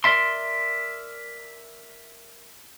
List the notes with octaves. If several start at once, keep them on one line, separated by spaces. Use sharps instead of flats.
A#4 D5 E5 C6